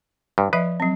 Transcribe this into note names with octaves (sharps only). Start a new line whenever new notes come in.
G2
F3 B4 D#5 E5
F#3 C4